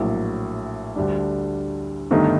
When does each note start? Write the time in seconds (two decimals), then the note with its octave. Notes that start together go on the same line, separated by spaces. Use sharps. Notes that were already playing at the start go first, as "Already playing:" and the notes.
Already playing: A#1 A2 F#3 A#3
0.96 D2 D3 G3 D4
2.11 G1 G2 D#3 A3 D#4